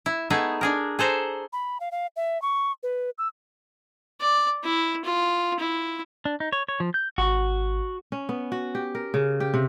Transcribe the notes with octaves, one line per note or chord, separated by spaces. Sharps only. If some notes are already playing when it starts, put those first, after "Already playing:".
E4
A3 B3 D#4 E4 G#4
D4 G#4 A#4
G#4 A4 C5 A#5
B5
F5
F5
E5
C#6
B4
E6
D5
E4
F4
E4
D4
D#4
C#5
C#5
F3
G6
G#1 F#4
C#4
B3
F#4
G4
A#4
C#3
G4
C3